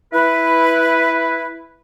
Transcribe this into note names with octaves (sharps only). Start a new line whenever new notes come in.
E4 B4